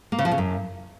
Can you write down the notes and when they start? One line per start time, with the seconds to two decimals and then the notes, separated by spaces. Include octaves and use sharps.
0.12 A#3
0.18 C#3
0.25 F3
0.31 C#3
0.38 F#2